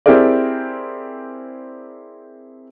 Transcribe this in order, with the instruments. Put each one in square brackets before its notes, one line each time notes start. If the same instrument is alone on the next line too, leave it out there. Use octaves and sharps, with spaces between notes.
[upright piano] C4 E4 G4 G#4 A#4 D5